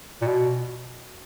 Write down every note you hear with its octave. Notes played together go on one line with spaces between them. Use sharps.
A#2
B2